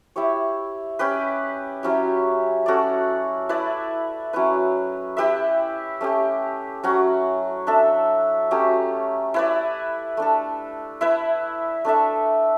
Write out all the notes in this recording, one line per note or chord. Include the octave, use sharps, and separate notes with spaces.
E4 G4 C#5
C#4 G4 B4
F#3 C#4 E4 G4
C#4 F#4 A4 D5
E4 B4 D5
F#3 C#4 E4 B4
E4 G4 B4 E5
A3 C#4 G4
F#3 C#4 F#4
D4 A4 E5
F#3 A3 C#4 G4
E4 B4 D5
A3 D4 A4
E4 B4 E5
A3 D4 A4 E5